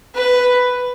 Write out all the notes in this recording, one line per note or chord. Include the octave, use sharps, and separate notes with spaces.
B4